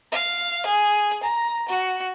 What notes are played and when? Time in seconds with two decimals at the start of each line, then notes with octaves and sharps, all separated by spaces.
0.12 F5
0.66 G#4
1.23 A#5
1.68 F#4